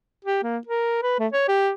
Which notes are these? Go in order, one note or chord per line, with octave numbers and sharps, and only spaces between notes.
G4
A#3
A#4
B4
A3
C#5
G4